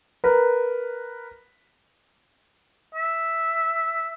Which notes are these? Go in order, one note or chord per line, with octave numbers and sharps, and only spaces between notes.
A#4 B4
E5